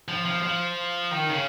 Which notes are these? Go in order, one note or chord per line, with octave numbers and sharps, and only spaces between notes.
F3
F3
F3
D#3
C#3